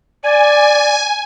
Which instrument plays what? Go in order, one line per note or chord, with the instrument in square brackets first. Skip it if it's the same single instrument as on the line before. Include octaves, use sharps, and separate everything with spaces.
[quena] D5 [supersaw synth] G#5